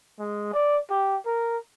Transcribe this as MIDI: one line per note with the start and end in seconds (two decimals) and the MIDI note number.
0.19 0.52 56
0.53 0.78 74
0.90 1.16 67
1.26 1.58 70